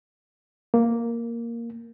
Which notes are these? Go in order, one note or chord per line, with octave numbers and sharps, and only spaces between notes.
A#3